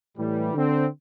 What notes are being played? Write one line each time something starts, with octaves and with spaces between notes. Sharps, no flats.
A2 E3 G3
D3 C4